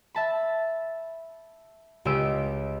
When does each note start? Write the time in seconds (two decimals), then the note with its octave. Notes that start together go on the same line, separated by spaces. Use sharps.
0.15 E5 A5 B5
2.05 C#2 C#3 G4 D#5 E6 D7